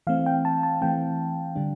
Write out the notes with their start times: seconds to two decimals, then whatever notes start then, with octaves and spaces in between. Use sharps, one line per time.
0.07 E3 A3 C4 F5
0.26 G5
0.45 A5
0.63 A5
0.81 E3 A3 C4 G5
1.56 D3 G3 D4